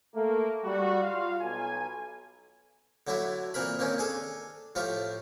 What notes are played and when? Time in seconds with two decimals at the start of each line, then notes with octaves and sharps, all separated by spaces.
0.15 A3 A#3
0.64 G3 F#4
1.02 F4 F5
1.41 B1 G#5
3.07 D3 F#3 A3 D4 E4
3.54 A#2 E3 C4 A#4 B5
3.79 D#3 A#3 C4 C#4
3.98 D4 G#4 A4
4.75 A2 F3 A3 F4 G4